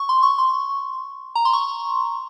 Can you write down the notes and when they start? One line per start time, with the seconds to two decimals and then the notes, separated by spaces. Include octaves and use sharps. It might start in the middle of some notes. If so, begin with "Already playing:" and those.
Already playing: C#6
0.09 C6
0.23 C#6
0.38 C6
1.35 A#5
1.45 C6
1.53 C#6